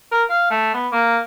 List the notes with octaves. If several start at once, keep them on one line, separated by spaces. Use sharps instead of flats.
A#4
F5
A3
B3
A#3